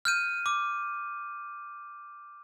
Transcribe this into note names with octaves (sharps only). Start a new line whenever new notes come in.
F6 G6 D#7
D6